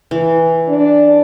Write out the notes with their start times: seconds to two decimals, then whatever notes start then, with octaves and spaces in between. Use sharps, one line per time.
0.11 E3
0.68 D4